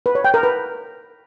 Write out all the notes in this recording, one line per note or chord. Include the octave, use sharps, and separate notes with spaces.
B4
C#5
G5
A#4
B4